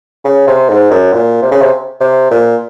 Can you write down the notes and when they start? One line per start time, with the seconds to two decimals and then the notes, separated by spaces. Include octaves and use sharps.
0.25 C#3
0.47 C3
0.69 G#2
0.91 F#2
1.13 A#2
1.42 C3
1.51 C#3
1.61 C3
2.01 C3
2.31 A#2